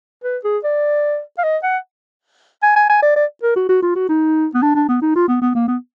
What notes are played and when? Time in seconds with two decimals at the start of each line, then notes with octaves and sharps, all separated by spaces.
0.24 B4
0.44 G#4
0.64 D5
1.38 F5
1.44 D#5
1.63 F#5
2.63 G#5
2.76 G#5
2.89 G#5
3.02 D5
3.16 D5
3.43 A#4
3.56 F#4
3.69 F#4
3.83 F4
3.96 F#4
4.09 D#4
4.54 B3
4.62 D4
4.75 D4
4.89 B3
5.02 D#4
5.16 F4
5.28 B3
5.42 B3
5.55 A#3
5.68 B3